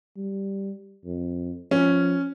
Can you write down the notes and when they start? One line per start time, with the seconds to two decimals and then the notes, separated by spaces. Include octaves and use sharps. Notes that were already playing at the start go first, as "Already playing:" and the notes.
0.17 G3
1.05 F2
1.71 F3 C#4